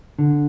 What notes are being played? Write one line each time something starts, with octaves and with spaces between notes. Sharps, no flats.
D3